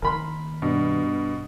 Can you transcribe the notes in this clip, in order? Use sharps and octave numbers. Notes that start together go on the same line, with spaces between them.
D#3 A#3 A#4 B5 C6
G2 B2